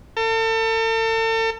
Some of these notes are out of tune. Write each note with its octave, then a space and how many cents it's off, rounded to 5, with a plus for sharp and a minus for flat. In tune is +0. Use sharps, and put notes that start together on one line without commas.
A4 +40